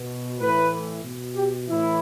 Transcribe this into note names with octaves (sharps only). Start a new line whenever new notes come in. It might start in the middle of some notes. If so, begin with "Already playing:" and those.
Already playing: B2
A2 E3 B4
B2
G4
A2 E3 E4